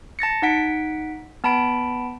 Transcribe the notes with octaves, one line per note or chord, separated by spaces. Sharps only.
A5 A6 A#6 C#7
D#4 F#5 B6 D7
B3 A5 B5 D7